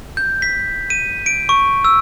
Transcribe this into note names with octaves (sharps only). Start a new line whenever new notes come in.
G6
B6
D#7
D7
C#6
E6